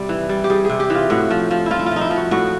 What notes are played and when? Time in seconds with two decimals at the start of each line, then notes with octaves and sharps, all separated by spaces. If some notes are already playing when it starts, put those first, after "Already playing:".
Already playing: C3 G3
0.09 E3
0.29 G3
0.44 G4
0.50 G3 G#4
0.65 C3 G#4
0.80 G4
0.90 E3 F4
1.10 A2 F#4
1.31 F3
1.51 F3
1.66 F3 E4 F4
1.79 E4
1.86 F4
1.91 F3 D#4
2.01 E4
2.11 F3
2.16 F#4
2.31 A2 F#4